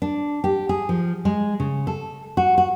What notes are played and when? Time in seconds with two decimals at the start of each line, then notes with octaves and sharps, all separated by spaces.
0.02 D4
0.44 G4
0.69 G#4
0.89 F3
1.25 G#3
1.60 C#3
1.87 A4
2.37 F#4
2.58 F#4